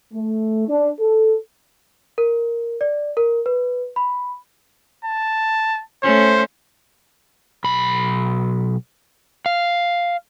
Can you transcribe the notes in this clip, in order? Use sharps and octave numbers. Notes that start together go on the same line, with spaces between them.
A3
D4
A4
A#4
D5
A#4
B4
B5
A5
A3 C#4 C5
B1 B5
F5